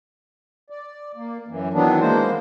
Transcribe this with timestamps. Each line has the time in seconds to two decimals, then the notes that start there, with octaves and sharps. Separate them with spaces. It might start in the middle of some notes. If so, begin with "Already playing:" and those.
0.70 D5
1.15 A#3
1.48 F#2 E3
1.73 D#3 E3 F#3 B3 D4
2.00 G#3 A#3 C5